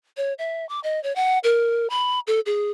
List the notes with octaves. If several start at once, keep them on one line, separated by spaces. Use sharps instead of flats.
C#5
E5
D6
D#5
C#5
F#5
A#4
B5
A4
G#4